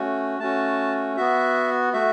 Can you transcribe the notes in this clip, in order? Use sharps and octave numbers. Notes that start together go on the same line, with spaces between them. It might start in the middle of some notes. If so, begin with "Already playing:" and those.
Already playing: A3 C#4 F#4
A3 C#4 F#4 A5
B3 F#4 E5
A3 F#4 E5